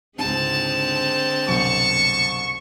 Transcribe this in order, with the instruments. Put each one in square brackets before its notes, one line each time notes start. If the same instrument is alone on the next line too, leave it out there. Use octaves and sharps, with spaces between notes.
[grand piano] C#2 G#2 [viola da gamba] D3 G#3 C4 [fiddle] A5
[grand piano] C2 F#2 B2 [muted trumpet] C#6